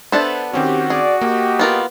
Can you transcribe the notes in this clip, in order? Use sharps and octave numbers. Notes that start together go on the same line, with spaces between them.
B3 D4 A4 C5 E5
D#3 C4 C#4 F#4 G4
G#4 D5
A#3 G4 D#5
B3 F4 A#4